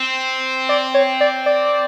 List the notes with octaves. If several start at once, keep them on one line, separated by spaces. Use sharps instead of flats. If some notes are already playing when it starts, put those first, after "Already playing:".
Already playing: C4
D5
C#5
D5
D5